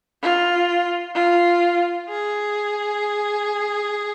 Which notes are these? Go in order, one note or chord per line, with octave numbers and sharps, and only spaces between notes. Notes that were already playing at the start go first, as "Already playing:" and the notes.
F4
F4
G#4